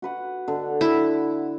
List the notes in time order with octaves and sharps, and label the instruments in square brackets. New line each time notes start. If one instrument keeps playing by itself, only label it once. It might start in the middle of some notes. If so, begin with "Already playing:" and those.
[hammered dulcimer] F#4 B4 F#5
D3
[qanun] E4